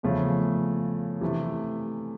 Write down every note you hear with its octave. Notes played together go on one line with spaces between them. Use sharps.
E2 C#3 F3 A3
C3 E3 A3